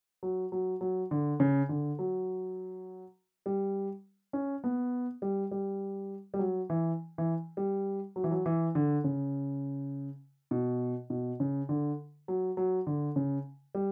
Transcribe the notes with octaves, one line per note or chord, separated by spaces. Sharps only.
F#3
F#3
F#3
D3
C#3
D3
F#3
G3
C#4
B3
G3
G3
G3
F#3
E3
E3
G3
F#3
E3
F#3
E3
D3
C#3
B2
B2
C#3
D3
F#3
F#3
D3
C#3
G3